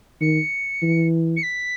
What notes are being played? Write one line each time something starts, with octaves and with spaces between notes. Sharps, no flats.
D#3 C#7
E3
C#7
B6